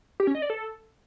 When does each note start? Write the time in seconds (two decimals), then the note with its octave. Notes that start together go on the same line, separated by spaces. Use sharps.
0.20 G4
0.27 C#4
0.35 D#5
0.42 D5
0.50 A4